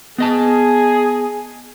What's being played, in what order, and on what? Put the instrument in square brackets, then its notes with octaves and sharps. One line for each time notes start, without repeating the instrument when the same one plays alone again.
[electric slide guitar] B3 D#5 A5 [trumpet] G#4